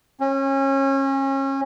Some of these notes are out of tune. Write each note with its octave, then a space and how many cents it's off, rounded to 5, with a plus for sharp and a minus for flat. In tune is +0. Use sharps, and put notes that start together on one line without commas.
C#4 -30